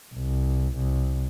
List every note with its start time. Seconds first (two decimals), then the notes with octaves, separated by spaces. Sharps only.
0.14 C2
0.76 C2